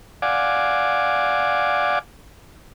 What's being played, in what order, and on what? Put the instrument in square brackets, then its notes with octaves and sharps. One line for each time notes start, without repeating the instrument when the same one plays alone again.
[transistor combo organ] D5 F5 F#5 G#5 D6